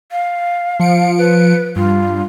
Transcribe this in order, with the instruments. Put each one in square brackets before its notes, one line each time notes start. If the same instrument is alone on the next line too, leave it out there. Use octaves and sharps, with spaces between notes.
[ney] F5
[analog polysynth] F3 C#7 D7
[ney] B4
[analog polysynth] G2 [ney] F4